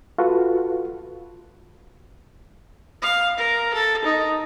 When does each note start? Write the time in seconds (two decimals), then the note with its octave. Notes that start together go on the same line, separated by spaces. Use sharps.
0.18 F4 F#4 A4 B4
3.02 F5
3.37 A#4
3.74 A4
4.04 D#4